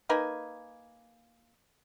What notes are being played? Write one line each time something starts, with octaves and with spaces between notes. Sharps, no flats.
A#3 D#4 B4 G#5